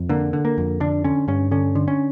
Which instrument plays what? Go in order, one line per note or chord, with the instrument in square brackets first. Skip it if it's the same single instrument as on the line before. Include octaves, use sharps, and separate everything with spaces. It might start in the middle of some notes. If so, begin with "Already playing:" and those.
Already playing: [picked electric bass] F2
D3 A#3
D3
A#3
F2
D3 D4
D3 C#4
G2 C#4
D3 C#4
D3
C#4